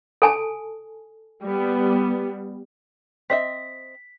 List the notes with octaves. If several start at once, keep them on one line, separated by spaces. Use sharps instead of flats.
A4 G#5 A5
G3 B3
C4 D#5 E5 B6